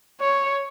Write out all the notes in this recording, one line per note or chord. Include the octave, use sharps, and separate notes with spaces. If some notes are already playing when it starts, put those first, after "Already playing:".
C#5